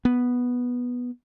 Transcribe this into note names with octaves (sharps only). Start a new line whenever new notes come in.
B3